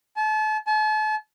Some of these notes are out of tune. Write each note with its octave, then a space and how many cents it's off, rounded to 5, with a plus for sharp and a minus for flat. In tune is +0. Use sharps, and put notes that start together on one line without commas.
A5 -35
A5 -40